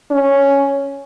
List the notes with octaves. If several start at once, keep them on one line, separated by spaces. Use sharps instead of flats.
C#4